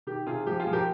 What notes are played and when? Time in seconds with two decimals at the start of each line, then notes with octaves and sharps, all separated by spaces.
0.07 D#3 G4
0.27 C3 F4 G#4
0.47 F3 G4
0.60 F4 G#4
0.67 F3
0.73 G4 A#4